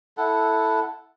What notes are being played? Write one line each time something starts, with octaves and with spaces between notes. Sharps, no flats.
E4 A4 F#5